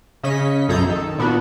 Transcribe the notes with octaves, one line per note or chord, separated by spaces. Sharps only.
C#3 C#4 D#5 B6
B1 F#2 G#4 A4 A#5 G6
D#3 A4
A#2 B3 D4 F#4